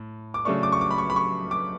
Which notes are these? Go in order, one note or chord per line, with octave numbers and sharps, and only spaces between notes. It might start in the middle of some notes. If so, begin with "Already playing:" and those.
Already playing: A2
D6
C#3 F#3 A3 D4 C#6
D6
C#6
D6
B5
C#6
B5
C#6
D6